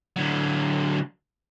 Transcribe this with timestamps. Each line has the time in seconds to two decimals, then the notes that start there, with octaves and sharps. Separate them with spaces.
0.16 D3 F#3